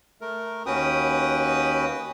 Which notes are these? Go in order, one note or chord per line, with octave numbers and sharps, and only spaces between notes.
A3 A#4
D#2 C#4 F#4 B4 G5 D#6